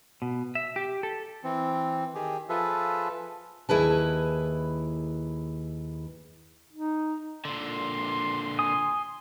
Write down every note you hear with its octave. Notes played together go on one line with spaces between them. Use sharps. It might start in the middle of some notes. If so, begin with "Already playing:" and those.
B2
E5
G4
A4
E3 C4
D#3 G4 G#4
F3 F4 G#4 A4 B4 E5
D#2 E4 G#4 B4 A5
D#4
A#2 D3 C6
G#5 D#6